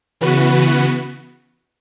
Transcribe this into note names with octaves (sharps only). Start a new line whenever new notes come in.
C#3 E3 B3 F#4 B4